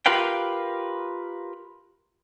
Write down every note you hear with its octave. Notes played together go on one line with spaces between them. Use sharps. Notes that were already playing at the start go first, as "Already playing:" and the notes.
F4 G4 A#4 B4 F5 G5